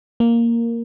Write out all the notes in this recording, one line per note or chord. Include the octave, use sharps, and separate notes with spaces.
A#3